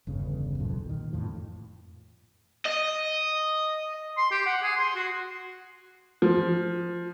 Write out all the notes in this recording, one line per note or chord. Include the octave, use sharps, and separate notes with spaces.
G1 E2 C#3
D#1 B1 F2
A#2 D#3
F2 A2 F3
D#5
C6
G4
F#5
G#4
C6
F#4
F3